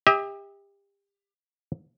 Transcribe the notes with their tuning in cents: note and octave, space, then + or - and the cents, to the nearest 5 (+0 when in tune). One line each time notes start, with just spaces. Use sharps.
G4 +30 E5 -45